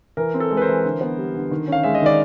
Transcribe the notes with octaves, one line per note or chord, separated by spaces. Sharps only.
E3 A#4
C4
A4
G#3
B4
A#4 C5
E3
D3
B3
G3
D3
D#3
C#4 F5
G#3 E5
D#5
D#3 D5